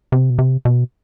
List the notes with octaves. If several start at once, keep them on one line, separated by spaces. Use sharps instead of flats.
C3
B2
C3
B2